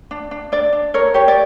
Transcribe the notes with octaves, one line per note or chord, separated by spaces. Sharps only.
D4
D4
D4 D5
D4
A#4 C#5
G4 C#5
D5